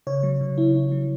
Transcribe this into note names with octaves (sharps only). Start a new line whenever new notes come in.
C#3 C#5
F#3
C#3
E4
E4
F#3